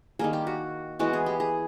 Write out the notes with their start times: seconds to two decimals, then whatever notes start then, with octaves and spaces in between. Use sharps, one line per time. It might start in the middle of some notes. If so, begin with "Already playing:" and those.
0.19 D#3 G3 A#3 G#4
0.33 G4
0.47 F#4
0.99 E3 G#3 B3 F#4
1.13 G#4
1.26 G4
1.40 G#4